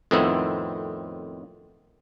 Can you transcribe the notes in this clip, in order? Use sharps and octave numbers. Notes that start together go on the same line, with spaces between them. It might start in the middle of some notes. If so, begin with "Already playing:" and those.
F2 A2 D#3 B3 C4 E4